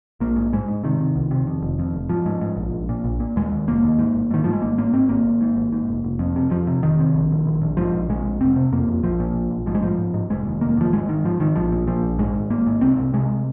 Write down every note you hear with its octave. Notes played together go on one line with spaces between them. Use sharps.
A#1 A#3
G#2
G#2 G#3
G#2
C3 D#3
C3
C2
C3
F2
F1
F2
F1
G#2 F3
G#2
G#2
A#1
A#1
A#2
A#1
A#2
D#2 G#3
D#2
F1 A#3
D#2
G#2
G#1
G#2 D#3
G#2 F3
G#3
G#1 A#3
G#2 A#3
G#2 C4
G#1 A#3
G#1
G#2
G#1
G#2
F1
F1
F2
C3
F2 F3
C3
F1 D#3
C3
A#1
A#1
A#1
A#1
G#2 F3
A#1
A#1 G#3
A#1
F1 C4
C3
F2 A#3
F2
A#1 F3
A#2
A#1
A#1
G#2 F3
G#3
G#2 F3
G#2
G#2
F1 G#3
D#2
F1 A#3
D#2 F3
G#1 G#3
G#2 D#3
G#2 F3
G#2 D#3
A#1 F3
A#2
A#2 F3
A#1
G#2 G#3
G#1
G#1 A#3
G#2
C2 C4
C2
C3 G#3